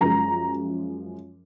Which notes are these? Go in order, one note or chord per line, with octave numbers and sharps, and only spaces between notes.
F#2 F3 G#3 A#5